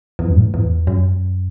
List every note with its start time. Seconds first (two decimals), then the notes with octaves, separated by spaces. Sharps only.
0.19 E2
0.28 F#2
0.36 A2
0.45 G#2
0.54 E2
0.87 F#2